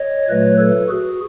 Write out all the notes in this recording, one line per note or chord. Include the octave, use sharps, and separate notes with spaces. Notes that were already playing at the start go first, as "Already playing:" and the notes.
Already playing: C#5 D#5
A#2 F#3 A3 B4 C#5
A4 B4
F#4 G#4